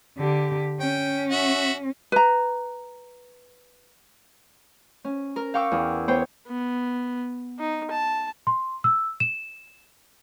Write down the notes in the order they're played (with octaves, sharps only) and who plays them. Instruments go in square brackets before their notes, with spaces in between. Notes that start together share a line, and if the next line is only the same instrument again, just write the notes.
[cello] D3 G4
[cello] C#4 [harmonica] G5
[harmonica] F#4 E5
[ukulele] B4 A#5
[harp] C#4
A#4
F5 G5 C#6 D6 E6
E2
B3 C5 C#5 G5
[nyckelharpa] B3
D#4
A5
[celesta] C6
E6
E7